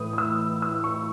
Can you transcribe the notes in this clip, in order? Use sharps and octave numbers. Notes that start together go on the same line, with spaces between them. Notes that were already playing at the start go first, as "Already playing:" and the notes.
Already playing: A2 E3 D#6
D#6
E6
E6
C#6